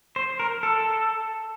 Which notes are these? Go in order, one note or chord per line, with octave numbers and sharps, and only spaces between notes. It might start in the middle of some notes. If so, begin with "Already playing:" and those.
C5
A#4
A4